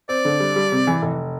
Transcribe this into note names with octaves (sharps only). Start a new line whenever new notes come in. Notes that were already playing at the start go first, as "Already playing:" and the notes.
C4 D5
D3
G3
G3
C3
E3
F1